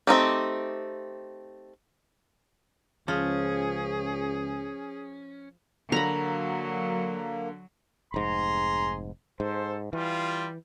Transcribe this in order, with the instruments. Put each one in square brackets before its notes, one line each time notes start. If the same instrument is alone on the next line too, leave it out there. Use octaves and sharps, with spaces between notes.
[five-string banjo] A3 C4 D#4 G4
[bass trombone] C#2 [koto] F3 [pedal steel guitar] C#4 [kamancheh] G#4
[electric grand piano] D3 [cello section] F#3 [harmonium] A#3 [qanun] A#5 B5
[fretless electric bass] F1 G#2 [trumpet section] G#4 A#5 C6
[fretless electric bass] G#2 [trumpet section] A4 C5
[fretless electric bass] E3 [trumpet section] G3 F4